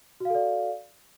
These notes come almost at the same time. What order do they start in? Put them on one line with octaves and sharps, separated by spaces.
F#4 F5 A4 D5